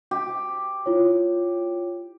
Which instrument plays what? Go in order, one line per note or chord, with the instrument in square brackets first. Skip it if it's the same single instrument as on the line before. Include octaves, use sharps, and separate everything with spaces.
[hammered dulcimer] G4
[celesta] E4 F4 C#5